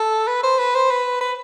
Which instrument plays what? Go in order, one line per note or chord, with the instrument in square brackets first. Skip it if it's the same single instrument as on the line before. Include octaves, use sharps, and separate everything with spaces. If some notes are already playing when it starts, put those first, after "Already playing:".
Already playing: [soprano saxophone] A4
B4
C5
B4
C5
B4
B4